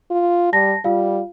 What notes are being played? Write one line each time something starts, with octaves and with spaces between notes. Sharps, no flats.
F4
G3 A5 A#6
G3 F4 F5